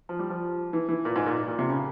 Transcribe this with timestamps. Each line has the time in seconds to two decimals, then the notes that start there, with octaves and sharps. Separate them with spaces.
0.09 F3
0.19 G3
0.30 F3
0.73 E3
0.89 E3
1.05 A#2
1.16 G#2
1.26 A#2
1.37 A#2
1.48 A#2
1.59 C3
1.69 C#3